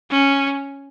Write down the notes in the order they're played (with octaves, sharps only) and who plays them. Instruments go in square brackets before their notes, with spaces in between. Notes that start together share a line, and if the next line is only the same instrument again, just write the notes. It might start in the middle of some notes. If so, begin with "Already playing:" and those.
[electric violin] C#4